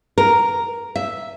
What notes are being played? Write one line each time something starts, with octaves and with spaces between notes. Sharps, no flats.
A#4
E5